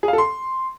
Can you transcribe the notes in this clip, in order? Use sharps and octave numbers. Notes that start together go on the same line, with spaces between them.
G#4
F5
A4
C6